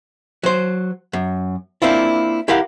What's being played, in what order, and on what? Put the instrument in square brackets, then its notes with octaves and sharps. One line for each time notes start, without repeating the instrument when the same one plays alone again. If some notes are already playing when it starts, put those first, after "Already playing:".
[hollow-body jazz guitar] F#3 C5
F#2
A#3 C4 D4 E4 F4
E4 G4 A#4 F5 F#5